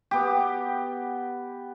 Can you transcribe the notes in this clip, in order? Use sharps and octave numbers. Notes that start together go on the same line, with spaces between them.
B3 G4